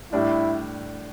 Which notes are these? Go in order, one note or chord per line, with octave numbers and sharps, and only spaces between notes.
A2 G3 D4 E4